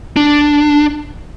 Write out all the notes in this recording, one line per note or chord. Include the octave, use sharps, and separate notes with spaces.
D4